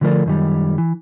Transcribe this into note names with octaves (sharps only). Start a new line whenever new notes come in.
D3 F3 A3 C4 A#4 D5
F#2 D#3 G3
E3